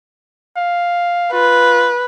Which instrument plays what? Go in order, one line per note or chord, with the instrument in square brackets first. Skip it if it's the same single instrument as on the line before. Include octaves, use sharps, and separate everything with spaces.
[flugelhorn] F5
[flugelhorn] F4 [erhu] B4